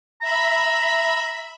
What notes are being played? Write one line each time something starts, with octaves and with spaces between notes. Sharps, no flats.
E5 A#5 B5